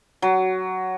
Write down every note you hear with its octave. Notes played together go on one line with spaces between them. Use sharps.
F#3